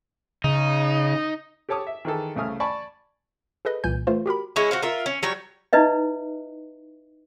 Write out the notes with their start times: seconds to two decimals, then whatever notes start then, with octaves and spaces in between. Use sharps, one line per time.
0.44 C#3 D#4
1.69 G4 A4 C#5 A5 D6 D#6
1.87 E5
2.05 D#3 E3 G#4 A4
2.36 C2 C#3 A3 G#5 D#6 F6
2.60 D5 G#5 A5 B5 C#6
3.65 G#4 A4 B4 D#5
3.84 C2 A#2 E3 G#5 G6
4.07 E3 A3 F4 C5
4.26 F#4 G4 A#4 B5
4.56 G#3 C#4 E4
4.71 F#4 C5 F5
4.82 F4 A#4 E5
5.06 C#4
5.23 F#3 G3 C#5
5.73 D#4 E4 B4 D#5 E5